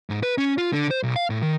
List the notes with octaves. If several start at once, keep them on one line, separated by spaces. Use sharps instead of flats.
G#2
B4
C#4
F4
D3
C5
B1
F5
A2
D#3